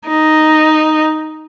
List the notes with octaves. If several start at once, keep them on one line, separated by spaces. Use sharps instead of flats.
D#4